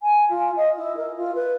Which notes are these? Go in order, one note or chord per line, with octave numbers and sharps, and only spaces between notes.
G#5
F4
D#5
E4
A#4
F4
B4